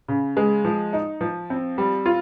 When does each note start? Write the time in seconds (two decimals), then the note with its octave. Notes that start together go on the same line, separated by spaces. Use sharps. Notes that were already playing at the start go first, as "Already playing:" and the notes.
0.08 C#3
0.37 G#3
0.65 F3
0.93 D#4
1.21 F3
1.50 C4
1.78 G3
2.06 F4